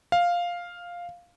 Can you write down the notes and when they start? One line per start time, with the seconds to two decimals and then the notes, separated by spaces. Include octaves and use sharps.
0.12 F5